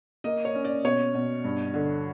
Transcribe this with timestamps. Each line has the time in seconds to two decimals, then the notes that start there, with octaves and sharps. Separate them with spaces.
0.24 A#3 D#5
0.45 C#5
0.55 C#4
0.65 D5
0.84 B2 C#5
1.14 B2
1.44 G2
1.74 D3